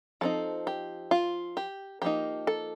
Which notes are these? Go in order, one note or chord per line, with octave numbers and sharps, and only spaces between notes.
F3 C4 D#4 A4
G4
F4
G4
F3 A#3 D#4 G4
A4